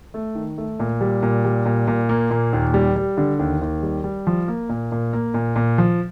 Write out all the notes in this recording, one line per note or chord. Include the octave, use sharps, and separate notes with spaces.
A3
D#3
A3
A#2
G3
A#2
G3
A#2
A#2
A#3
A#2
D#2
G3
G3
D3
D#2
D#2
G3
G3
F3
A#3
A#2
A#2
A#3
A#2
A#2
F3